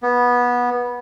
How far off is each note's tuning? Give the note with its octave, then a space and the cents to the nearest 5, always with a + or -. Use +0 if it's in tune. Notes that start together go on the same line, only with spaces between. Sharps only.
B3 -15